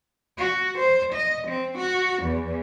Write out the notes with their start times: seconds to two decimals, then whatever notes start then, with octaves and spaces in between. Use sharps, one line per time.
0.38 F#4
0.78 C5
1.14 D#5
1.48 C4
1.78 F#4
2.23 E2